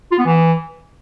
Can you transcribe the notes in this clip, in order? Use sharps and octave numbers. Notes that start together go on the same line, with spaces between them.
F4
B3
E3